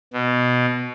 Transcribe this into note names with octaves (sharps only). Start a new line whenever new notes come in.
B2